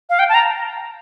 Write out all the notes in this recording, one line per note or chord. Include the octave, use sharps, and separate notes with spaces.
F5
G5
A5
A#5